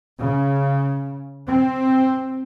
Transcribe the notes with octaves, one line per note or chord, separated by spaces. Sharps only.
C#3
C4